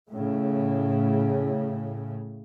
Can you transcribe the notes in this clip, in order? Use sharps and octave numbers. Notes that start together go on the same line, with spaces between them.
A2 C#3